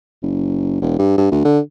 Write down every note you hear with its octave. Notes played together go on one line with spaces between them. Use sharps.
F#1
E1
G2
G2
D2
D3